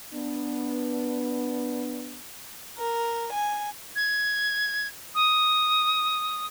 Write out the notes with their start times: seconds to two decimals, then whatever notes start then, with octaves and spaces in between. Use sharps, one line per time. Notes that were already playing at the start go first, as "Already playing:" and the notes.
0.14 B3 D4
2.77 A#4
3.32 G#5
3.96 G#6
5.15 D#6